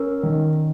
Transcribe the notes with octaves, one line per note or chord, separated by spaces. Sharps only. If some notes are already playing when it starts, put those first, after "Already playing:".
Already playing: C#4 A#4
D#3